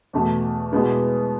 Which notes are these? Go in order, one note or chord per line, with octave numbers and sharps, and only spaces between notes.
E2 B2 A3
B2 G#3 B3 E4